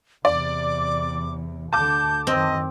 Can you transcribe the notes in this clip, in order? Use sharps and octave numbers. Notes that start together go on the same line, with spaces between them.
E2 C3 D5 D6
D2 D3 A5 D6 G6
F#2 D#3 C4 D#5